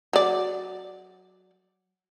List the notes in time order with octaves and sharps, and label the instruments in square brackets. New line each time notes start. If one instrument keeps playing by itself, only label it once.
[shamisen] F#3 D5